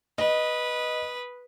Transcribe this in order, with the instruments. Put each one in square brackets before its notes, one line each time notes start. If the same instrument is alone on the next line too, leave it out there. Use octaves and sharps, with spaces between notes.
[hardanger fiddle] B4 D#6 [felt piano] D#5